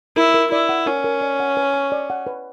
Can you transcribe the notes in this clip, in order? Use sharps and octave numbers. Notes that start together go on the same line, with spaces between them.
E4 A#4
A#4
E4 D5
F#5
C#4 A#4
A#4
D5
F#5
B4
C#6
D5
F#5
B4